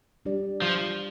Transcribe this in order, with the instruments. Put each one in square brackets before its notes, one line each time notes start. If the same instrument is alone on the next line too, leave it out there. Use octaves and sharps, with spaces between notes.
[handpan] G3 D4 G4 D5
[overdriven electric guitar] F3